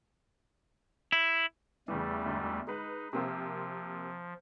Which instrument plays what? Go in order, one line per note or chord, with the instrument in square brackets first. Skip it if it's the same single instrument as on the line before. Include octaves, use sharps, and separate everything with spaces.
[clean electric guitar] E4
[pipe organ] E2 G3 A3 [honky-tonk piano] C#3 E3
[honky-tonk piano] D2 G#2
[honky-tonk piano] G#3 B4 [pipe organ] D#4
[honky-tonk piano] C3 A#3 C4 [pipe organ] F3